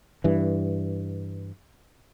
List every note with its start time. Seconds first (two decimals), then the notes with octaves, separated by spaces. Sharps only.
0.24 G2 E3